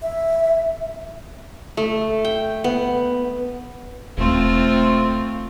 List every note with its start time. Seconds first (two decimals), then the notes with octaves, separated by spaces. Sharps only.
0.02 E5
1.77 A3
2.25 G5
2.64 B3
4.18 E1 A3 C4 F4